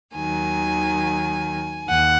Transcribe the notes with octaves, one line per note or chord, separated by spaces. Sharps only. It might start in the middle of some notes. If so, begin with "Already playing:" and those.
D#2 D#3 F#3 G#5
D#2 F#5